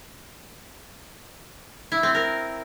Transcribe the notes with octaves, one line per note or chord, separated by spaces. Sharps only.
E4
C4
A#4